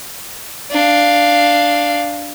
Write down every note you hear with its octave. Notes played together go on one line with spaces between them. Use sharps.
D4 F5